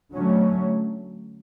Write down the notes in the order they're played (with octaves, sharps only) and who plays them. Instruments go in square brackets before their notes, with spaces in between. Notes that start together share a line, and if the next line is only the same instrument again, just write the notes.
[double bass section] D3 F#3 A3 C#4